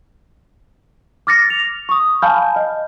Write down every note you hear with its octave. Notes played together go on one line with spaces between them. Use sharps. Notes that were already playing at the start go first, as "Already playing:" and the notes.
D6 F6 A6 A#6 C#7
F7
C#6 D#6
F5 G#5 A5 B5 F6 G6
D#5